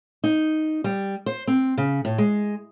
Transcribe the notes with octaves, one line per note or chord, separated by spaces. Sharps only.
D#4
G3
C5
C4
C#3
A2
G#3